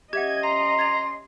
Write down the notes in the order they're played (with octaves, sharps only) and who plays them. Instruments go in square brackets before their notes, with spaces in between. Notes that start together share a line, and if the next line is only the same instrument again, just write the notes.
[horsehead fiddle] C#4 D#5 [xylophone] G4 E5 F#5 [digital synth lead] G#6
[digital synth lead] A#5 [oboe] C6
[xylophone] G#6 A6 F7